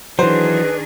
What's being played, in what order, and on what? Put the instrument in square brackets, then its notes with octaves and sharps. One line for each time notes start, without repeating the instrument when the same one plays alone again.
[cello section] D#3 D4 G#4 [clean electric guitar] E3 F#3 [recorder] B4 [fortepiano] C5